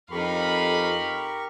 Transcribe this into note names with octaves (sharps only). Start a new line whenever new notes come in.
F2 D#4 G4 A#4 F5 B5 C#6